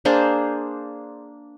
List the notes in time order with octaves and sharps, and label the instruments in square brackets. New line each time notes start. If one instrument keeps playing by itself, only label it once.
[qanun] A#3 D4 G#4 C5